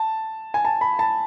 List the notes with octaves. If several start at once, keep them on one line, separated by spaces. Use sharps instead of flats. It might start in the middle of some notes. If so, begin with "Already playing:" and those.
Already playing: A5
G#5
A5
B5
A5